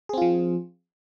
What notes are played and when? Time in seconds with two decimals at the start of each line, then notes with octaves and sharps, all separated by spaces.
0.09 G#4
0.13 C4
0.18 F4
0.22 F3